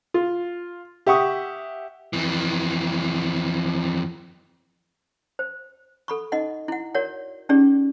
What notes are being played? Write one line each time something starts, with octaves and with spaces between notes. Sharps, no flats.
F4
G4 E5 F#5 C#6 D#6
F2 E3
C5
A4 B5 C#6
D#4 D#5 F#5
E4 F#5
F#4 A#4 C#5 D5 F#5
C#4 D#4 G4 G#4 D5